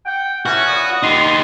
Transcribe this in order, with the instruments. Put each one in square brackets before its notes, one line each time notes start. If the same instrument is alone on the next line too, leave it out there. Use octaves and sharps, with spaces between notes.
[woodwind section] F#5 G5
[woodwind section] E3 A3 C#4 [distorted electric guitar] F#4
[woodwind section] A#2 B3 D#6
[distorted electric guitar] D#4 G4 [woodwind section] C6